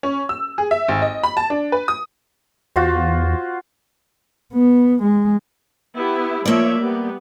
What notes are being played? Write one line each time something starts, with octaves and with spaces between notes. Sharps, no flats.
C#4
E6
G#4
E5
G#1
D#5
B5
A5
D4
B4
D#6
E2 F4 F#4 C5
B3
G#3
B3 E4 G4
F3 A#3 C#5 D5 E5
G3 B3 G4